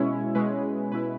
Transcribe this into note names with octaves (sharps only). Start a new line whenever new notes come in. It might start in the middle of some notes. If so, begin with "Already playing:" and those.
Already playing: B2 G#3 C#4 E4 C#5
B2 G#3 C#4 E4 B4
B2 G#3 C#4 E4 B4